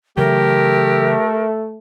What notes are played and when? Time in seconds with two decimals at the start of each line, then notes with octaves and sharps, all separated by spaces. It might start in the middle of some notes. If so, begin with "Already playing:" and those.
0.17 C#3 E3 F#3 A3 G4 A#4